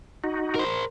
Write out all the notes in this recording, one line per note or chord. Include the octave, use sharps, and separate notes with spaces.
D#4 F#4
A#4 C5